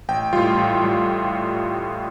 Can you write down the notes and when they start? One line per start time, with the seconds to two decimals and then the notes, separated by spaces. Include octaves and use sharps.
0.08 A1 G5
0.33 A2 G3 F4
0.57 A1
0.82 A2 G3